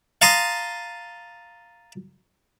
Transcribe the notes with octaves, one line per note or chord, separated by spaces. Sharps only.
F5 A5 A#5 C6 D#6